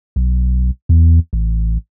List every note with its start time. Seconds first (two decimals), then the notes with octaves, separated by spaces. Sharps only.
0.16 B1
0.89 E2
1.33 A1